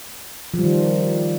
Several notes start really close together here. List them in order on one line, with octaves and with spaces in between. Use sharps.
F3 G3 D#3